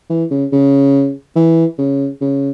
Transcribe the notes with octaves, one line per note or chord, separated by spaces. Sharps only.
E3
C#3
C#3
E3
C#3
C#3